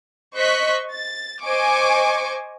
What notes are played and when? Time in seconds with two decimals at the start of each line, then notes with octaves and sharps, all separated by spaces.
0.35 C5 D#5 C#6 F#6 B6
0.91 A6
1.43 C5 D#5 G#5 C#6 D6